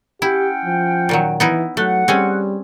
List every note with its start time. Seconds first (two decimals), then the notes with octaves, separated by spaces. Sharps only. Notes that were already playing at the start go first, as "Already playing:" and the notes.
0.22 C#4 E4 G4 F#5 G5
0.65 F3
1.09 A#2 D#3 F#3
1.40 E3 B3 D#4 E4
1.77 F#3 A3 F#5
2.08 G3 C4 C#4 G#4